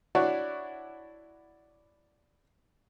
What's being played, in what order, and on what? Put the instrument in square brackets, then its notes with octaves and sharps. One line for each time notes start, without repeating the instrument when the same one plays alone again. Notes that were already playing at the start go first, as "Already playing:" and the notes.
[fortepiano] D4 E4 F#4 C#5 D5